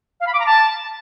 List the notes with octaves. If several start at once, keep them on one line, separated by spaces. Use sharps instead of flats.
F5
B5
D6
A#5
A5